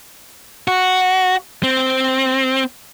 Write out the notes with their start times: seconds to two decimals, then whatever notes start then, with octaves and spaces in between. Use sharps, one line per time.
0.68 F#4
1.63 C4